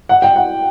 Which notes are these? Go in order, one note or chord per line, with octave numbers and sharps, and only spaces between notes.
F#5
G5
F#5